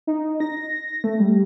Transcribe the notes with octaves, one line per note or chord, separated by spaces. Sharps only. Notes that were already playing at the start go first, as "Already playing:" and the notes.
D#4
A#6
A3
G3